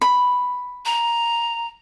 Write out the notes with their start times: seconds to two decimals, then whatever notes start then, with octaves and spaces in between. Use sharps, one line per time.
0.01 B5
0.85 A#5